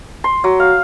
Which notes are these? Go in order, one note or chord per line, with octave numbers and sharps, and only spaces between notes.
C6
F#3
F5